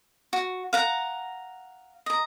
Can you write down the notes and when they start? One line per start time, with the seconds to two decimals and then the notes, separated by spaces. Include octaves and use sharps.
0.33 F#4
0.73 F5 F#5 A#5
2.06 D#5 A#5